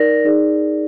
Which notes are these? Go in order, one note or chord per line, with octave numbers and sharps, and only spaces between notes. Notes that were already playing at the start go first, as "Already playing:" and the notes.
Already playing: D#4 A#4 D5 A#6
D#4 G#4 D5